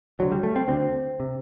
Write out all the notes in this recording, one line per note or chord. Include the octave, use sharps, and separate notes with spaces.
D2 D3 F#3
G3
A3
C4
D2 D3 C4
C3